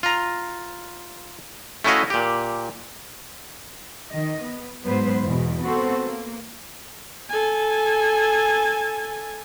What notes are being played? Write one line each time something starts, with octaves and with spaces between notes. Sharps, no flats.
F4 A#5
A3 C#4 E4 F#4 D#5 F5
A#2 G4
D#3 D#5
B3
G#2 F#3 B3 B4 C5
E2 B2
B3 C4 F#4 A4 C5
A#3
A4 G#5